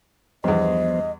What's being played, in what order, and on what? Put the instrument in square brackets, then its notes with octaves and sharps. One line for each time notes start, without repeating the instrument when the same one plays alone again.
[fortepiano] E2 G2 [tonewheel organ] F3 B3 C5 [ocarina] D#5